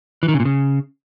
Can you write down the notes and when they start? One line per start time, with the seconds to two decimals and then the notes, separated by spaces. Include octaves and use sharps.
0.23 E3
0.28 D#3
0.34 C#3
0.40 A#2
0.45 C#3